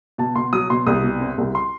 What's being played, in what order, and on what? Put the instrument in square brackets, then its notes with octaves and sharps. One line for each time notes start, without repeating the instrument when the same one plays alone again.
[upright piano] B2 [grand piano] A5
[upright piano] B2 [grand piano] C6
[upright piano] F#3 [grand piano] D#6
[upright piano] B2 [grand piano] C6
[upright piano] C2 [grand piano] D#6
[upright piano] B2
C4
C2
[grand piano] C6